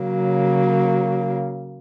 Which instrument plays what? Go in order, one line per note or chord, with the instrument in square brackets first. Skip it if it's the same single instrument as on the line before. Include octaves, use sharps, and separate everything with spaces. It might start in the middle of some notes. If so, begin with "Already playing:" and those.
Already playing: [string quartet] C#3 F#3 A#3